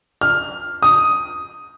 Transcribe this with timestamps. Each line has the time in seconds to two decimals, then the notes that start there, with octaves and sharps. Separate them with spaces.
0.21 F6
0.83 D#6